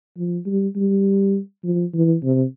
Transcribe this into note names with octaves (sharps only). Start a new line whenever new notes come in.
F3
G3
G3
F3
E3
C3